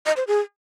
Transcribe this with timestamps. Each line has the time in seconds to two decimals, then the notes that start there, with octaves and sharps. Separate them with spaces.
0.06 D#5
0.17 C5
0.27 G#4